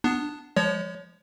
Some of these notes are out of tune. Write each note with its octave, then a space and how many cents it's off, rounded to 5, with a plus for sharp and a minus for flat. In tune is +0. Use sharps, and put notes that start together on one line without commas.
B3 +5 D4 +10
F3 +0 G#3 -25 C#5 +20